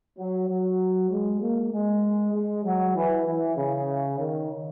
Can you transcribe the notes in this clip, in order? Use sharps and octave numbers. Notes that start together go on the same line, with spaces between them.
F#3
F#3
G#3
A#3
G#3
G#3
F#3
E3
E3
C#3
D#3